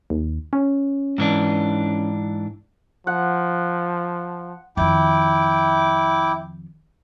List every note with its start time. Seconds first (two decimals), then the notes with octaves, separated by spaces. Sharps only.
0.10 D#2
0.53 C#4
1.18 G#2 E3 D4
3.07 F3 F#5
4.77 F2 D#3 E4 G5 D6